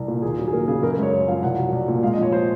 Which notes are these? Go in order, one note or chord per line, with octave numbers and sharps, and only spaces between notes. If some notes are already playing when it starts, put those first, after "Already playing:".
Already playing: C2
A#2
D#2 G#4
F#3
G#4
D#2 A#4
C#3 G#4
F#2 A#4
A#4
G#3 C#5
F#2 C#5
F3 F5
C2 F#5
F#3
C2
A#2
G#3 F5
D#5
F3 C#5
C5